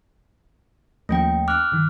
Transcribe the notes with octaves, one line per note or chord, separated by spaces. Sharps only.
D#2 F3 A3 A#3 C#4 G5
D6 F6 F#6
G2 D#3